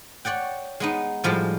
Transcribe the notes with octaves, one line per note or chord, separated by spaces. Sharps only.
C#5 D5 F#5 G5
G#3 B3 D#4
A2 F3 G3 G#3 G4